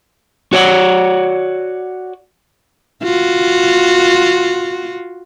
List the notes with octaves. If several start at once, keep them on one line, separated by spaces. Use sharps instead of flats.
F#4 C#5 D5 F5 F#5
F4 F#4